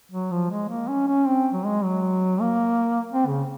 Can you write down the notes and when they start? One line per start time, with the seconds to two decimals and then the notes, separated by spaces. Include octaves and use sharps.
0.12 F#3
0.31 F3
0.50 G#3
0.69 A#3
0.88 C#4
1.08 C#4
1.27 C4
1.53 F#3
1.65 G#3
1.84 F#3
2.41 A#3
3.12 C4
3.27 C#3